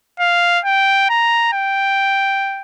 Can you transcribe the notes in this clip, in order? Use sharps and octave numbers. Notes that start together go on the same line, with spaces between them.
F5
G5
A#5
G5